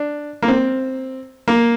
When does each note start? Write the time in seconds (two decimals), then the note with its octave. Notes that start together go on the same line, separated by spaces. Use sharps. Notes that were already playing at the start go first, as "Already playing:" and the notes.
Already playing: D4
0.43 A#3
0.48 C4
1.48 A#3